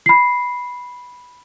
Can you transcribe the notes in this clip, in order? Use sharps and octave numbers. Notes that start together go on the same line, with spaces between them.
B5 C7